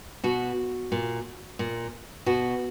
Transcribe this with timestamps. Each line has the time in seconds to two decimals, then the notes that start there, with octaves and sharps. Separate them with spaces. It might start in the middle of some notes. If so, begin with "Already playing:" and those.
0.24 B2 F#4
0.92 A#2
1.59 A#2
2.26 B2 F#4